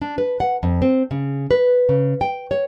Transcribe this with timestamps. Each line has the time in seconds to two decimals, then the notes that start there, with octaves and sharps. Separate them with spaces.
0.02 D4
0.18 B4
0.40 F#5
0.63 F2
0.82 C4
1.11 C#3
1.51 B4
1.89 C#3
2.21 G5
2.51 C#5